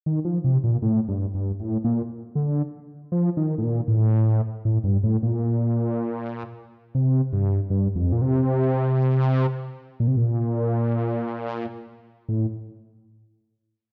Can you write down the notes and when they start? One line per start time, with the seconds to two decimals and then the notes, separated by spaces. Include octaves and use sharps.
0.06 D#3
0.25 F3
0.44 C3
0.64 A#2
0.82 A2
1.08 G2
1.34 G2
1.60 A2
1.84 A#2
2.35 D3
3.12 F3
3.37 D#3
3.58 A2
3.63 A#2
3.88 A2
4.65 A2
4.84 G2
5.03 A2
5.23 A#2
6.95 C3
7.33 G2
7.70 G2
7.95 F2
8.13 A#2
8.22 C3
10.00 A#2
10.07 C3
10.17 A#2
12.29 A2